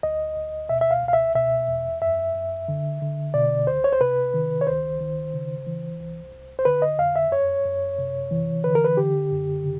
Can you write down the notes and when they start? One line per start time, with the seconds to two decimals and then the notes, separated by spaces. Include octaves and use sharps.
0.03 D2 D#5
0.36 D2
0.69 B2 E5
0.81 E5
0.91 F5
1.03 C#2
1.08 F5
1.13 E5
1.35 B2 E5
1.68 E2
2.02 F#2 E5
2.35 F#2
2.68 D3
3.02 D3
3.34 B2 D5
3.67 C#2 C5
3.84 C#5
3.93 C5
4.01 C3 B4
4.34 D#3
4.61 C#5
4.67 C#2 C5
5.01 D#3
5.34 C#3
5.67 E3
6.00 C2
6.33 C2
6.59 C5
6.65 D3 B4
6.82 D#5
6.98 F2 F5
7.16 E5
7.32 F#2 C#5
7.65 F#2
7.98 C3
8.31 E3
8.64 D3 B4
8.75 A#4
8.85 B4
8.97 D3 G4
9.32 F#2
9.64 C#3